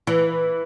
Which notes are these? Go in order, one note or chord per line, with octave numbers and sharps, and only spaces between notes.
E3